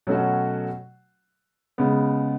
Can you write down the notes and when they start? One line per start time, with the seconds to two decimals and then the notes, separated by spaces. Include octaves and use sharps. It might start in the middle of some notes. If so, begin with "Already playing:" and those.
0.07 B2 F#3 A3 C#4 F#4
1.78 C#3 G#3 B3